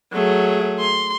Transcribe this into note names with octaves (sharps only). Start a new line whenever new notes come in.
F#3 A3 G#4
C6